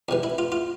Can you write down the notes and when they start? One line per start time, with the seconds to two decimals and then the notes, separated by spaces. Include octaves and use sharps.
0.09 F2 C3 E3
0.23 E4
0.38 F4
0.52 F4